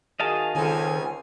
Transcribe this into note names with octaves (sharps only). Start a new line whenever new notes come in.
D#3 F#4 G#4 D#5 F5 A5
C#2 D#3 C4 A4 G#5